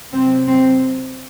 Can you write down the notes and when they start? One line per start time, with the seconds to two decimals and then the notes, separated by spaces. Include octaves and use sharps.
0.13 C3 F#3 C4
0.48 C4